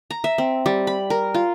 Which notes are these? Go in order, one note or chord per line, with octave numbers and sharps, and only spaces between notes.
A#5
E5
C4
G3
B5
A#4
F4